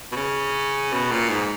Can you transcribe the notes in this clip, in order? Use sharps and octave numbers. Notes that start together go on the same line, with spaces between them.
B2
C#3
B2
A#2
G#2